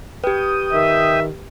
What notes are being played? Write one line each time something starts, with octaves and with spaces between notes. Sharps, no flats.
G4 B4 G5 D#6
D#3 E5